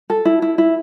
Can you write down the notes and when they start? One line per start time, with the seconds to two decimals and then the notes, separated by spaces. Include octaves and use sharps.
0.10 A4
0.25 E4
0.42 E4
0.58 E4